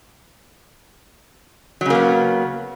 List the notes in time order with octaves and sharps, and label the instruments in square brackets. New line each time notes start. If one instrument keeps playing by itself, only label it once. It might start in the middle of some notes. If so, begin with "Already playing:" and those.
[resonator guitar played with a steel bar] F#3
C#3
A#3
B3